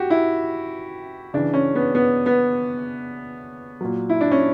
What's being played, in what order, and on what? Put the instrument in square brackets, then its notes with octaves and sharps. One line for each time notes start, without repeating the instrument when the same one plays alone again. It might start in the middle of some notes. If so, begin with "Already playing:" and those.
Already playing: [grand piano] F#4 G4
E4
C#3 E3 D4
C#4
B3
B3
B3
A#2 F#3
E4
D4
C#4